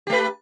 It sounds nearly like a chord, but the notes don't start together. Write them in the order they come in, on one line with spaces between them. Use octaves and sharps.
G4 A3 B4